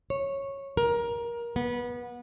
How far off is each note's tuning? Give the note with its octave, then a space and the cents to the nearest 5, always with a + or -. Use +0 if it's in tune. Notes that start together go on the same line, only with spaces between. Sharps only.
C#5 -10
A#4 +20
B3 -25